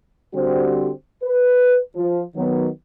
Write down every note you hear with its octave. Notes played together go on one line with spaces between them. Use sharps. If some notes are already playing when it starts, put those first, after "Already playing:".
D3 G3 C4 F#4 G4 C5
B4
F3
D#3 F#3 B3